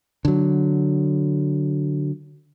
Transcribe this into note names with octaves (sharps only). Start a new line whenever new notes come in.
D3 F#3